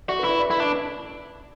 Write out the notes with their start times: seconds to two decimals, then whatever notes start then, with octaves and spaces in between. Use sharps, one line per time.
0.08 F#4 D5
0.19 B4
0.24 E4
0.29 D5
0.40 D5
0.49 E4 B4
0.58 D4 D5